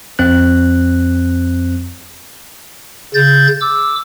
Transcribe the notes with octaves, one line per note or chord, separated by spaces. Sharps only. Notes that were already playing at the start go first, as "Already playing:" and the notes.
F2 C4 F#6
C#3 G6 A6
D6 E6